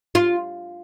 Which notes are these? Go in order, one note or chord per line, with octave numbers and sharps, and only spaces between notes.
F4